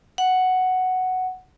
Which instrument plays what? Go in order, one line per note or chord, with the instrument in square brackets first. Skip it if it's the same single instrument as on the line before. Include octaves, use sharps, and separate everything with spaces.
[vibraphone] F#5